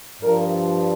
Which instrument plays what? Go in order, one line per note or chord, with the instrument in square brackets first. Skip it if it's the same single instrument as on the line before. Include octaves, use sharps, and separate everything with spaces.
[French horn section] G2 F3 A#4